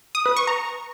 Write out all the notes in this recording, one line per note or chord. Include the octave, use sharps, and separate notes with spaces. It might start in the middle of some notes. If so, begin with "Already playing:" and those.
D#6
B4
C#6
A#5